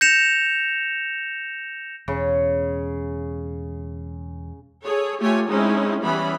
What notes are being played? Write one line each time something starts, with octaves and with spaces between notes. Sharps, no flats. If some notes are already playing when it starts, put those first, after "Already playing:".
G6 A#6 C#7 E7 F7
E1 C#3
G#4 A4 C#5
A3 F4 G4 C#5 G#5
G#3 C4 C#4 D#4 E4
E3 G3 B3 C#4 B5